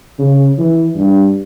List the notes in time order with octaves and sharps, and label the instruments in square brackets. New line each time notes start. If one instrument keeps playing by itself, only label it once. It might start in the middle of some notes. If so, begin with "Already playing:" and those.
[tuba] C#3
E3
G2